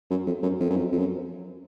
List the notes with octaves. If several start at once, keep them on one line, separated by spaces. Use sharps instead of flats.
F#2
F2
F#2
F2
F#2
F2
F2
F#2